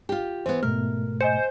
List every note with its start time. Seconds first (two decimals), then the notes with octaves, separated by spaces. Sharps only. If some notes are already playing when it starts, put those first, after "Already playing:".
0.09 F4 G4
0.46 E3 B3 C5
0.63 G#2 B2 A3 A#4 F6
1.21 C5 D#5 G#5 C#7